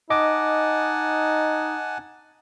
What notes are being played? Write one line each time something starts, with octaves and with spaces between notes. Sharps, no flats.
D#4 D#5 F#5 G#5 A5 D6